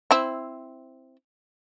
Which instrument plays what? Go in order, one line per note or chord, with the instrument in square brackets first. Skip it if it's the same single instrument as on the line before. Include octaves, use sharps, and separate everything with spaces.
[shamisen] C4 E4